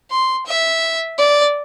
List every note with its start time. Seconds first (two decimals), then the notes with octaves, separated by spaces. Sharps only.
0.11 C6
0.46 E5
1.18 D5